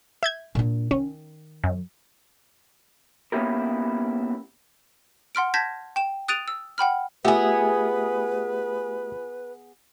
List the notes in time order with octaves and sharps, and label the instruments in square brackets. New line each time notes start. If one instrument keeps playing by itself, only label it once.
[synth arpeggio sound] E5 G6 G#6
[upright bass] A#2 D4
[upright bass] D#3 [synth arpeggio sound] C#4
[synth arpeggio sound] F#2
[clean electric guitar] A#3 B3 C#4 E4 G4 A#4
[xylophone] F#5 C6 F6 D7
A5 G6 G#6 A#6 B6
G5 E7
D#6 F#6 A6 D7 D#7 F7
E6
F#5 G5 B5 F6
[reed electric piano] A3 G4 E5 [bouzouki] B3 G#4 [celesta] F4 G#5 [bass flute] B4